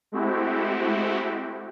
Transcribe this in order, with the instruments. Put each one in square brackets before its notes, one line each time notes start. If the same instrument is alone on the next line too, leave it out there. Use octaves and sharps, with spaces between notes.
[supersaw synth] G#3 A3 C4 E4 F#4 G4